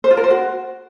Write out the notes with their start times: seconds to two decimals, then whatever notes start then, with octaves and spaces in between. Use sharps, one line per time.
0.04 C5
0.11 F4
0.17 A#4
0.24 C5
0.30 F#4